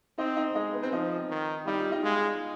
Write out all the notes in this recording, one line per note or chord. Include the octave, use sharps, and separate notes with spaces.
C4 D#4 D#5
D#4 D#5
G#3 D#4 D#5
B3 B4
C4 C5
F3 D#4 D#5
D#3
G3 D#4 D#5
F4 F5
D#4 D#5
G#3 F4 F5